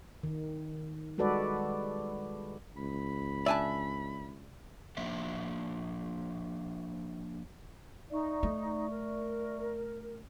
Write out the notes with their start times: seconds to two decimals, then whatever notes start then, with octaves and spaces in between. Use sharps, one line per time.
0.23 D#3
1.18 G3 G#3 F#4 A4 B4 D5
2.77 C#2 B5
3.46 D4 D5 E5 G#5 A5
4.97 F3 A#3 D4 E5
8.10 D#4 D5 E5 C#6
8.43 A3
8.89 A#4